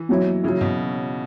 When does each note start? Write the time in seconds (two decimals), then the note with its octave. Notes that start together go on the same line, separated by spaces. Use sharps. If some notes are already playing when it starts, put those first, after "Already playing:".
Already playing: E3
0.09 B2 F#3 E4
0.44 C#3 F#3 E4
0.61 B2